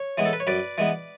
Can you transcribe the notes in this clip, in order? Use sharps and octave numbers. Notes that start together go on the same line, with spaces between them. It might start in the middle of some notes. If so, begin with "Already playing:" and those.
Already playing: C#5
E3 G#3 B3
A4
B4
C#5
F#2 B4 D5
E3 G#3 B3